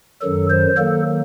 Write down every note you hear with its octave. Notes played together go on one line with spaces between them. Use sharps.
F#2 D#3 F#3 A4
C5
D#3 F#3 A#3 A4